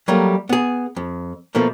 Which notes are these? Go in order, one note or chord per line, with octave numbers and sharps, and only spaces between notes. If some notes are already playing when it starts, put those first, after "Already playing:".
F#3 G3 A3 A#3
B3 G#4
F2
B2 F3 A3 A#3